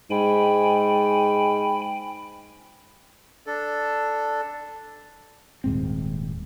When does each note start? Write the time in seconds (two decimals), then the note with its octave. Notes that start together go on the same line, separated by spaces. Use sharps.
0.10 G#2 G5 G#5 B5
3.47 D4 A4
5.64 D#1 G#2 C4